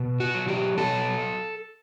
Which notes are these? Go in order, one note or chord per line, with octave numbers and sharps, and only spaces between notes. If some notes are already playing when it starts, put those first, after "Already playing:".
Already playing: B2
F#4
F#3
G4
B2 A4